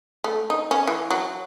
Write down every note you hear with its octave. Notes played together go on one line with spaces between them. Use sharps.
A3
D#4
C#4
E3
F#3